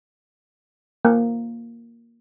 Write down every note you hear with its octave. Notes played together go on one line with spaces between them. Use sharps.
A#3